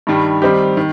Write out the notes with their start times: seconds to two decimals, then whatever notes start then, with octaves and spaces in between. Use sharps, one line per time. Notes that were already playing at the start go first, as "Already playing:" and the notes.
0.07 G2 D#3 G3
0.42 D#3 G3 C4 D#4 G4
0.77 D#3